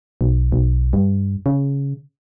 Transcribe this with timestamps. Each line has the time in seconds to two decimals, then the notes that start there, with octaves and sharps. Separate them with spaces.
0.21 B1
0.52 B1
0.93 G2
1.46 C#3